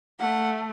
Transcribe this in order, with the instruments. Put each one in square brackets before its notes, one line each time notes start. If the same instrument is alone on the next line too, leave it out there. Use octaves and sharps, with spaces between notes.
[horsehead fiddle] A3 [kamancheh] F#5